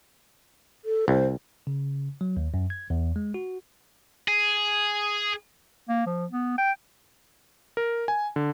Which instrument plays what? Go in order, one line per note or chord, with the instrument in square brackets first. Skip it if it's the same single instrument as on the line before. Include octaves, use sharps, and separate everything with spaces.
[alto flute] A4
[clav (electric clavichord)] C2 [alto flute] C5
[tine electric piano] C#3
F#3
D#2
F#2
G#6
E2
G#3
F#4
[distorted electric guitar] G#4
[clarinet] A#3
F3
B3
G5
[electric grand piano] A#4
G#5
D3